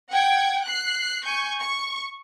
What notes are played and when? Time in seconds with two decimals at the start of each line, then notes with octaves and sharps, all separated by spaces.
0.10 F#5 G5 G#6
0.64 F#6 C7
1.23 G#5 C#6 G6
1.61 C#6